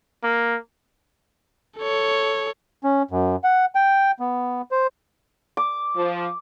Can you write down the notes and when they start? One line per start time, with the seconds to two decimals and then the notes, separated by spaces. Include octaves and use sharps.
0.23 A#3
1.78 A4 C#5
2.84 C#4
3.11 F#2
3.44 F#5
3.75 G5
4.20 B3
4.72 C5
5.57 D6
5.96 F3